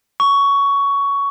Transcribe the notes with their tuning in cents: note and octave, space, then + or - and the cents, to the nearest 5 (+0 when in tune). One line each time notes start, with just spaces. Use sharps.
C#6 +15